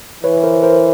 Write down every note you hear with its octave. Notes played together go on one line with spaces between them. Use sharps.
E3 B4 C#5
A#4 C5
A#4 C5